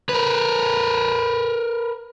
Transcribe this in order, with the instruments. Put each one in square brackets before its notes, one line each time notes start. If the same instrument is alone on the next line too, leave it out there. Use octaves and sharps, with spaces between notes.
[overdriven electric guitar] A#4 B4